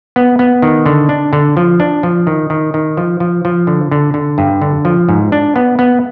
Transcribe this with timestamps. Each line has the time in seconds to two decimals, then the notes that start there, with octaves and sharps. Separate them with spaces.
0.16 B3
0.39 B3
0.62 D#3
0.86 D3
1.09 D4
1.33 D3
1.57 F3
1.80 D4
2.03 F3
2.27 D#3
2.50 D#3
2.74 D#3
2.97 F3
3.20 F3
3.45 F3
3.67 D3
3.91 D3
4.14 D3
4.38 G2
4.62 D3
4.85 F3
5.09 G#2
5.32 D4
5.56 B3
5.79 B3